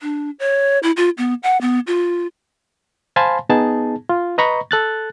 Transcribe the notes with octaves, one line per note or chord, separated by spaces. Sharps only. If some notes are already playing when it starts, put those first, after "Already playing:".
D4
C#5
E4
F4
B3
F#5
B3
F4
C5 F5 G#5 A5 B5 C6
B3 D#4 G#4 A5
F4
B4 D#5 A#5 B5 C#6
A4 F#6 A6